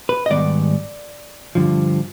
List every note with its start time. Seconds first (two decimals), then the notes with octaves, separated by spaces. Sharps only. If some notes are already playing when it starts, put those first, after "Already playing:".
0.09 B4
0.26 D#5
0.30 G#2 D#3 G3 B3 D5
1.55 G2 D3 F3